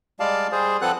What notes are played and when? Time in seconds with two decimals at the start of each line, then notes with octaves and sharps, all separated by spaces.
0.20 G3 G#3 D5 F5 A5
0.52 G3 G#4 C5
0.82 F3 C4 A4 B4 F#5 F#6